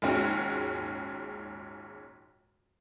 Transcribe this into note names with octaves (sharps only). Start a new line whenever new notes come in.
A#1 D#2 G#2 G#3 C#4 F#4